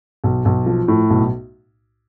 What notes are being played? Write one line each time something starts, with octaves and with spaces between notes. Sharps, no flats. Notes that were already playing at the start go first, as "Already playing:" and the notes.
B1
B1
F3
A2
B1